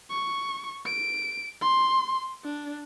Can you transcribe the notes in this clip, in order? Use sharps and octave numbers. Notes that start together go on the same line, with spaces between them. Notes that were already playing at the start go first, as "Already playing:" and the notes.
C#6
D7
C6
D4